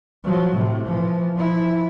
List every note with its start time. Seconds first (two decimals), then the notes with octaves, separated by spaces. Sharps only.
0.24 F3 F#3
0.53 A2 C3
0.87 E3 F3
1.36 F3 E4